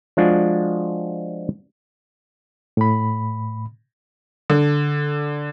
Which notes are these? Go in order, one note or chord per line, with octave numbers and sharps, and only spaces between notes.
F3 G#3 D4 F4 F#4
A2 B5
D3